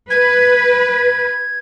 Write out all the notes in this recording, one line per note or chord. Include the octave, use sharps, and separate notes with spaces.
B4 G#6